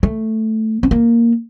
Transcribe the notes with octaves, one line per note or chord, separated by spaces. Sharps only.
A3
C4
A#3